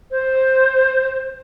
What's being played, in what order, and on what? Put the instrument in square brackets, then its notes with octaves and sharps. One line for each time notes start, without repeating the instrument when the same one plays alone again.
[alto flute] C5